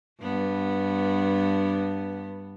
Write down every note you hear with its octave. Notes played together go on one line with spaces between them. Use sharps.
G2 B3